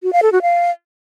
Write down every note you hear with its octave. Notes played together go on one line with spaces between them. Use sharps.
F#4
F5
A4
F#4
F5